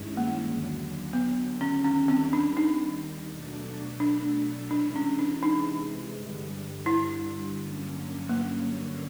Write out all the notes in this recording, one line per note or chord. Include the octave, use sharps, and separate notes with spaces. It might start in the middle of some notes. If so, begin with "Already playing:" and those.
Already playing: G2 D#3 G#3 C#4 E4
A#3
D#2 D3 F#3
B3
C#4
D#2 D#3 G3 C#4
C4
D4
D#4
B2 F#3 A3 D4
D4
C3 E3 G#3 D4
C#4
D4
D#4
G2 D3 G3
E4
G2 D3 F#3 A#3 C#4
A#3